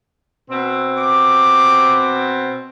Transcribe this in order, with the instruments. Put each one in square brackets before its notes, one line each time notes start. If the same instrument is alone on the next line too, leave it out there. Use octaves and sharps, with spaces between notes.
[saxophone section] B2 C4
[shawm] D6